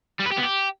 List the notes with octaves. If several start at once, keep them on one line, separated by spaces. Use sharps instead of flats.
G3
B4
G4
B3
G4